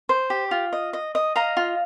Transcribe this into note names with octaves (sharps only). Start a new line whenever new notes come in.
C5
G4
F4
D#5
D#5
D#5
D#5 F5 A#5
F4